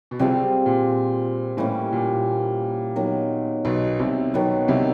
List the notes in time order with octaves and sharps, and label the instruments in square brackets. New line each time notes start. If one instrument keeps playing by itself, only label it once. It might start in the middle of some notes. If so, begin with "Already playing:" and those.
[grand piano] B2
[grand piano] C2 C3 [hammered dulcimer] G3 C4 F4 G#4
[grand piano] A#2
[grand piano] A2 [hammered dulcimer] E3 G3 A#3 C#4
[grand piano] A#2
[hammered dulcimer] D#3 F#3 B3
[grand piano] B1 B2
C2 C3
[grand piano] B1 B2 [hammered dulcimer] D#3 F#3 B3
[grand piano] C2 C3